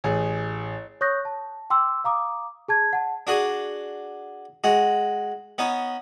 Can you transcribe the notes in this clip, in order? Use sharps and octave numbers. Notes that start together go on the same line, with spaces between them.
A1 G#4
C#5 C#6 D#6 F#6 G6 A#6
A5
G5 C6 D6 E6
F5 A#5 D6 D#6
G#4 A5 G#6
F#5 A5
D4 F#4 G#4
G#3 F#4
B3 C#4 D#4